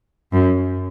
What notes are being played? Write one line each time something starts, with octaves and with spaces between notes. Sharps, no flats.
F#2